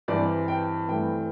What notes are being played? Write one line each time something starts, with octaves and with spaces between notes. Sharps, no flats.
G2 E3 G#3 C4 D5
G5
G2 E3 A3 C4 G5